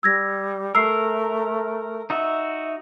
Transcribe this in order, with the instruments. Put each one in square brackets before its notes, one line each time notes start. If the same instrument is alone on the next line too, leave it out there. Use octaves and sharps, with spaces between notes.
[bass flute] G3 [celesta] E6 G#6 A#6
[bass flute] A3 [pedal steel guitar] A#4 [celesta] E6 C7
[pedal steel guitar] D#4 F#4 E5